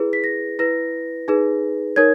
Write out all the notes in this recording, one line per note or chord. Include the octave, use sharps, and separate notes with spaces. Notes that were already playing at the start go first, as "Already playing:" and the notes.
Already playing: E4 G#4 B4
B6
A#6
E4 B4 A#6
D#4 G#4 B4
D#4 A#4 C#5 G#6